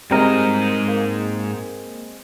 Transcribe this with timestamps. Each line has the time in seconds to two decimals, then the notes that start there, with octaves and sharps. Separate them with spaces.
0.11 G#2 G3 G#3 C4 A#4 D#5
0.88 A#3